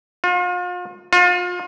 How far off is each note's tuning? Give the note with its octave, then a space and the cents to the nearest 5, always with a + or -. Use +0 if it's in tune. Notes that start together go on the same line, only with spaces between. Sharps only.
F4 +40
F4 +35